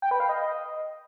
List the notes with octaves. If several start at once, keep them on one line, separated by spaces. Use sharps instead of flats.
G5
B4
F5
D#5